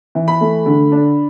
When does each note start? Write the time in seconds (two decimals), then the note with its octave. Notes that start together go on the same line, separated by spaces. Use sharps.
0.15 E3
0.28 B5
0.41 A3
0.66 D3
0.92 D4